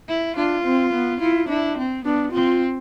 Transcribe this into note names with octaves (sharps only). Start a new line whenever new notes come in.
E4
D4 F4
C4
B3
E4 F4
D4 E4
C4
B3 D4
C4 F4